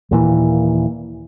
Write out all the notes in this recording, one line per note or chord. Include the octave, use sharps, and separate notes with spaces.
D#2 A#2 E3